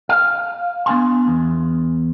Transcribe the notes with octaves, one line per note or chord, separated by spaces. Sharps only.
F5
B3 D4 G#5 C6
E2